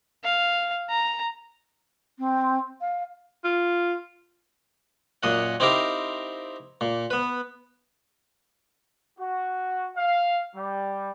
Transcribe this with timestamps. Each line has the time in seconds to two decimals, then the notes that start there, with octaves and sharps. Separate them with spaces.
0.24 F5
0.89 A#5
2.19 C4
2.81 F5
3.44 F4
5.23 F#2 A#2 D#5 F#5
5.60 C4 D#4 E4 G4 A#4 F5
6.81 A#2
7.10 B3 B4
9.18 F#4
9.96 F5
10.54 G3